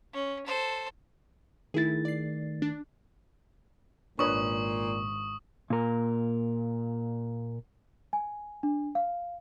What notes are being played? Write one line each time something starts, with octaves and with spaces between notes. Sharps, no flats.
C#4
A4 C5
D#3 A3 E4 G#4 A6
D5 C7
D4
G#1 A#2 D4 B4 C#5 C#6 D#6
A#2 A#4
G#5
D4
F5